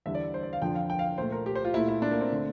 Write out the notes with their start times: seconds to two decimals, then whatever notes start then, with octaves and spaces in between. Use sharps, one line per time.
0.06 E2 D3 G3 E5
0.15 D5
0.34 C5
0.43 D5
0.53 F5
0.62 F2 D3 F3 G5
0.75 F5
0.90 G5
0.99 F5
1.18 A#2 A3 C5
1.32 A#4
1.46 G4
1.55 C5
1.65 F4
1.74 A#2 A3 E4
1.88 E4
2.02 D4
2.11 A#3
2.21 C4
2.32 D3 A3